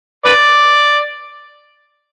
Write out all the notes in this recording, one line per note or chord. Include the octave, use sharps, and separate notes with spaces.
B4 D5